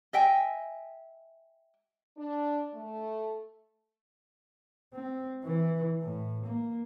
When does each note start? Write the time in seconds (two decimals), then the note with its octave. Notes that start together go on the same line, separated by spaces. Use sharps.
0.13 D#5 E5 G5 G#5
2.17 D4
2.74 A3
4.93 C4
5.44 E3
6.01 A2
6.45 A#3